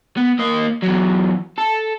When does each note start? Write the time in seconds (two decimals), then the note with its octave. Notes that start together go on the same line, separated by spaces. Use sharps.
0.17 B3
0.39 A#3 D#5
0.82 E2 F#3
1.58 A4